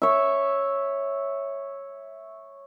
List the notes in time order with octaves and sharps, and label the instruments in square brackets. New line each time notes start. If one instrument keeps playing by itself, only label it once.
[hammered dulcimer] C#5 E5